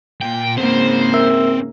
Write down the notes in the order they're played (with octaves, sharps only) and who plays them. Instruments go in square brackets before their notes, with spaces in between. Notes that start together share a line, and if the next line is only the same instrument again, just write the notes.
[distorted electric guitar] A#2 [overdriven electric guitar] G5
[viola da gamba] G#2 C#3 A#3 [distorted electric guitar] C4 B4 [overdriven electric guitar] C5
[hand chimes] A#4 E5 E6